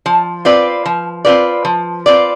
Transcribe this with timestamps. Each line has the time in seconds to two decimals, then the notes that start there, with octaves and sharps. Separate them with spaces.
0.06 F3
0.45 C4 F4 B4 D5
0.86 F3
1.25 C4 F4 B4 D5
1.65 F3
2.06 C4 F4 B4 D5